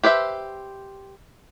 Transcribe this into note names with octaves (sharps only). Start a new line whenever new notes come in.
G4 B4 C5 E5